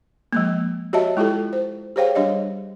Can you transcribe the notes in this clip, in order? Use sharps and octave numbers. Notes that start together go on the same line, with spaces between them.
F3 G#3 A#3
F#4 G4 C#5 D#5 E5 A5
G#3 E4 F4 G4 A4
C5
G4 G#4 C5 C#5 F5 G5
G3 D4 G4 C#5 D#5